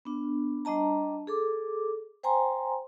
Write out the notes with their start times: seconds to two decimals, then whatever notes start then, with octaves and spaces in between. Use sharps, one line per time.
0.05 B3 D4
0.65 G3 D4 D#5 A5 A#5
1.27 G#4 A4 D6
2.23 C5 G5 G#5 A#5 C6